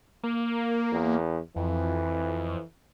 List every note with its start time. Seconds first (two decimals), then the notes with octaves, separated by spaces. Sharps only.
0.24 A#3
0.92 E2
1.56 F2 E3